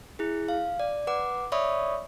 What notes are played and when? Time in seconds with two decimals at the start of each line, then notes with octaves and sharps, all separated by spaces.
0.19 E4 G#4
0.48 F5
0.80 D5
1.07 B4 F#5 D6
1.52 C#5 D5 E5 B5 C#6 D#6